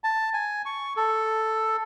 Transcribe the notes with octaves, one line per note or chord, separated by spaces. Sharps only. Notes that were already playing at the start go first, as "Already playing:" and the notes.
A5
G#5
C#6
A4